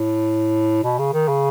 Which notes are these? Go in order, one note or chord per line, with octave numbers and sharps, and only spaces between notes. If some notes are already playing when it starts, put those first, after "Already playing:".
Already playing: A2
B2
C#3
D#3
C#3